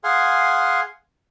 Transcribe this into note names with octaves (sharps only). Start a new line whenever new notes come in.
G#4 F5 F#5 G#5 C6